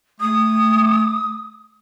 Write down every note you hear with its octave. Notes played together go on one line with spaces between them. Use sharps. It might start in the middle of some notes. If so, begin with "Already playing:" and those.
A3 D#6